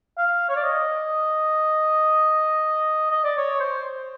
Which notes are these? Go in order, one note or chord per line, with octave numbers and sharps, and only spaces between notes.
F5
C#5
D5
D#5
D#5
D5
C#5
C5